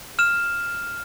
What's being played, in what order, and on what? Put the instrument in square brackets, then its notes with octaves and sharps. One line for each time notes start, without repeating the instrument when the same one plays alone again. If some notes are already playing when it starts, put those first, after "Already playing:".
[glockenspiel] F6 E7